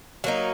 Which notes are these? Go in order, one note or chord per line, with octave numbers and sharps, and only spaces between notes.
F#3 A#3 D#4